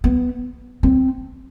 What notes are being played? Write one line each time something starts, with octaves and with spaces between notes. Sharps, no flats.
B3
C4